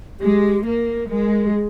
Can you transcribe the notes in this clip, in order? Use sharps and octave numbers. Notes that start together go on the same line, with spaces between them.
G#3 G4
A#3 A#4
G#3 A#4
G4
G#4